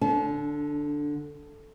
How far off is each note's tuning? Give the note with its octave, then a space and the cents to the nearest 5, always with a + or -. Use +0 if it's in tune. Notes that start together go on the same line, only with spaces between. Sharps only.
D3 +0 D4 -40 A5 -40